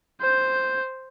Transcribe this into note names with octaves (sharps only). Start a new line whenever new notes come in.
C5 G6